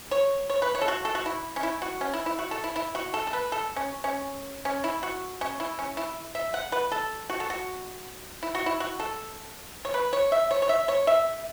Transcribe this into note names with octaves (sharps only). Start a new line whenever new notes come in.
C#5
C#5
B4
C#5
A4
F#4
A4
F#4
E4
C#4
E4
F#4
C#4
E4
E4
F#4
A4
E4
E4
F#4
A4
A4
B4
A4
C#4
C#4
C#4
E4
F#4
C#4
E4
C#4
E4
E5
F#5
B4
A4
F#4
A4
F#4
E4
F#4
E4
F#4
A4
C#5
B4
C#5
E5
C#5
C#5
E5
C#5
E5